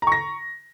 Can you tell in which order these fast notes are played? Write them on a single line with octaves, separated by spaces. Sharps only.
A#5 C#6 A#6